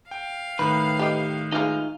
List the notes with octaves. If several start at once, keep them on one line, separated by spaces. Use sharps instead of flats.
F5 G5
A2 D#3 B4
G4 D#5
E3 G3 G#3 D#4 F4 F5